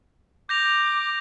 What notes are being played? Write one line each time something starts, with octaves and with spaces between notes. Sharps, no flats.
D6 G6 A#6 F7